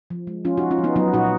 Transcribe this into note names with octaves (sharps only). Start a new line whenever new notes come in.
F3
G#3
F3 C#4 F4
D#4 F#4
F3
C#4 F4
F3
B3 D#4
F#3 B3 D#4
A#2 D#4 F#4